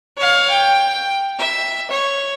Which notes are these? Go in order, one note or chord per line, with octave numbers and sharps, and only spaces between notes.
C#5 F5
G5
E5
C#5